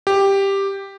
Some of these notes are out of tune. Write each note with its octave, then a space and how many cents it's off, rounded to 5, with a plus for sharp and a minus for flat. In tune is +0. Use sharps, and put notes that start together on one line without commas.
G4 +5